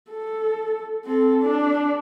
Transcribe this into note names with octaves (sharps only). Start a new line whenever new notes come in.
A4
C4 A4
D4